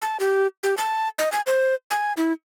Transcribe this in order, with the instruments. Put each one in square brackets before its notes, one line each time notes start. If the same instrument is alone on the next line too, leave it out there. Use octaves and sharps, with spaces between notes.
[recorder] A5
G4
G4
A5
D#5
G#5
C5
G#5
E4